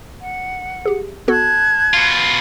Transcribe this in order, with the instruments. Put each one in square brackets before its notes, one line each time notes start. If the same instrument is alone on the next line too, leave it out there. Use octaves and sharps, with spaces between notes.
[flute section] F#5
[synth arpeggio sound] G4 G#4
[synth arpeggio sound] B3 F#4 A4 [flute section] A5 F#6 G#6
[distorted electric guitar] B2 F4